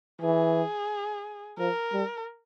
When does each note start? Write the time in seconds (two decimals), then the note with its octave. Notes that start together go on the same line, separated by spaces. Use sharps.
0.22 E3 G#4
1.58 F3 A#4
1.93 G3